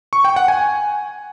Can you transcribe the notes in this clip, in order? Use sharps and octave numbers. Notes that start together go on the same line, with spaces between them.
C#6
G5
F#5
G#5